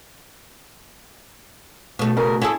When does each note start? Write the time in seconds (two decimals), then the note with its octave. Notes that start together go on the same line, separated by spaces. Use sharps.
1.99 B2 A3
2.17 C#3 A#4
2.42 C#4 E4 G#4 A4